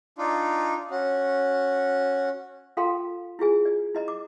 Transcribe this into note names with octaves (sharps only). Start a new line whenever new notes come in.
D4 D#4 F4
C#4 F#4
F4 A4 F5 G5 A#5 C6
E4 F4 G#4 G#5
D5
E4 D#5 A#5
D6